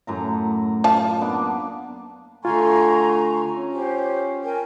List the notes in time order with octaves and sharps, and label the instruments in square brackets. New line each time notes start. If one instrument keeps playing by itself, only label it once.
[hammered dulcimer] F#2 A2 A#5
[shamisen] F4 A5
[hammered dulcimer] A#3 B3 D4
[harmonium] D3 A3 G#5 [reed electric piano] F4 [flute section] A#5 C6 C#6
[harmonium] C#4
[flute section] G4 C5
A#4 G5 G#5